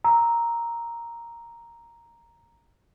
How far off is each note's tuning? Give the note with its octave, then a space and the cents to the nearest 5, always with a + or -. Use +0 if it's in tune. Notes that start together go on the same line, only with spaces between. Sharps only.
A#5 +0 E6 -15